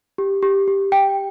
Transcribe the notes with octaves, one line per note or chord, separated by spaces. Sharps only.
G4
G4
G4
G5